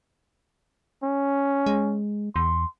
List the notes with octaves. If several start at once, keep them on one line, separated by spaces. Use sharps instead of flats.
C#4
G#3
E2 C6